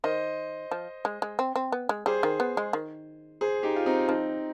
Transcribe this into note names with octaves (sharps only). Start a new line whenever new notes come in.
D#3 C5 D#5
F3
G#3
G#3
C4
C4
B3
G#3
G3 G#4 C5
D#3
B3
G#3
D#3
G#4 C5
D#4 G4
F4
C4 D#4
F3 C4 D#4